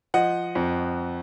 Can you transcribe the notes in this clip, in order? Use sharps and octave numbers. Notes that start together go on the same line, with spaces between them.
F3 D#5 F#5
F2